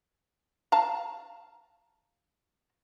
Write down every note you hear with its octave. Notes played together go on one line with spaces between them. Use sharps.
F5 A5 A#5